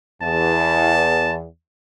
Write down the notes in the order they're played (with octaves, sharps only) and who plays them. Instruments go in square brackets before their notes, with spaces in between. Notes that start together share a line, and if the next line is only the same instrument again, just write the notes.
[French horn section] E2 [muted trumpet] A5